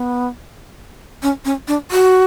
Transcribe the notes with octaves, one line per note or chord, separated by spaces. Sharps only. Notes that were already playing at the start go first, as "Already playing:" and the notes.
Already playing: B3
C#4
C#4
D4
F#4